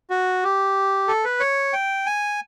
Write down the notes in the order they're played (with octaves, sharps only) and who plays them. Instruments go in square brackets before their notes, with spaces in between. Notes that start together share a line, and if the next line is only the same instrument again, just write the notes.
[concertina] F#4
G4
A4
B4
C#5
G5
G#5